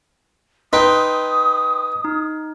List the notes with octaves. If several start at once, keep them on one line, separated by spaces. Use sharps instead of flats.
D#4 B4 G5 C6 D#6
D#4